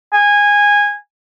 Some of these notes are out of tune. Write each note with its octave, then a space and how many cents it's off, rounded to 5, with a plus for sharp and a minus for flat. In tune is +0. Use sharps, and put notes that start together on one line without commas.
G#5 -15